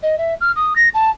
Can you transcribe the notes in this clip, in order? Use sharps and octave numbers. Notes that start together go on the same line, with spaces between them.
D#5
E5
F6
D#6
A#6
A5